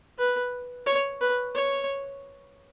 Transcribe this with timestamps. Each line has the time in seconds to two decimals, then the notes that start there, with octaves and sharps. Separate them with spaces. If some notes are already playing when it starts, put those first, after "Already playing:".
0.18 B4
0.87 C#5
1.21 B4
1.55 C#5